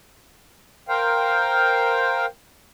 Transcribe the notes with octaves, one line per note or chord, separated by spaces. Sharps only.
A#4 C5 F5 G5